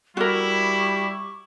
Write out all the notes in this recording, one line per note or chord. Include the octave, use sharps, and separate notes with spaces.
G3 E4 F#4 A#4 C#6 D6